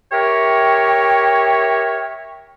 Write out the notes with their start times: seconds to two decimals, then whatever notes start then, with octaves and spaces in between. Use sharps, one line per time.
0.12 G4 A#4 C#5 E5 G5